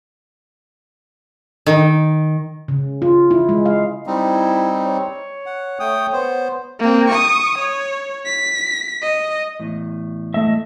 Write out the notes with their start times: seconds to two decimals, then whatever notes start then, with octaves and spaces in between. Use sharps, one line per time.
1.66 D#3
2.68 C#3
3.02 F4
3.31 E4
3.49 G#3
3.66 F5
4.07 G3 C4 D#4 E4
4.86 C#5
5.46 F#5
5.79 A3 G5 D#6
6.13 B3 C5
6.80 A#3 C4
7.09 C#6 D#6
7.58 C#5
8.26 B6
9.02 D#5
9.59 E2 A2
10.34 A3 D#5 E5